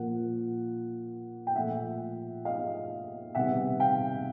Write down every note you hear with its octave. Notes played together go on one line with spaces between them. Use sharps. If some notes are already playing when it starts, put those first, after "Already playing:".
Already playing: A#2 F3 A#3 F#5
G5
A#2 F3 A3 E5 F#5
D#5 F5
C3 D#3 G3 B3 E5 F#5
F5 G5